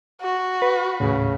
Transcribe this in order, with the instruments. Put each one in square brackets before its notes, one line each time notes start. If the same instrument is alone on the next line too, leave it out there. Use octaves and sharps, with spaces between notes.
[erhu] F#4
[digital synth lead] B4
[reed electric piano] D#2 A2 [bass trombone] C#3